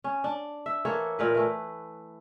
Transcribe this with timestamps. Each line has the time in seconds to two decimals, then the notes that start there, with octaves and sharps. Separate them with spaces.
0.04 C#4
0.24 D4
0.66 E5
0.85 E3 A#3 A4 C#5
1.19 A#2 A#4 B4
1.35 E3 A3